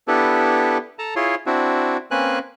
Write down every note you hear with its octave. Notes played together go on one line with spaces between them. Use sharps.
B3 D4 E4 G4 A4 B4
A4 A5 A#5
E4 F4 G#4 C#5 C6
C4 D4 E4 F#4
A#3 C4 C#4 B4 G#5 F#6